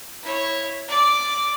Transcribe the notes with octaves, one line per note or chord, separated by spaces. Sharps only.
E4 C#5
D5 D6